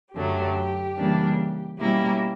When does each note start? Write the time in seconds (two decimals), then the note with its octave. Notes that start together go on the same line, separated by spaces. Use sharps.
0.15 F#2 D3 F#3 A3 G4
0.97 C#3 E3 G3 A#3 D4
1.79 B2 G3 A#3 C#4 E4 G4